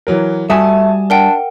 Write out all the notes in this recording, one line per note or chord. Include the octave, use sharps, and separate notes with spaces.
E3 F#3 A#4
G3 A3 F#4 E5 G#5 A5 D#6
D4 A#4 F#5 G5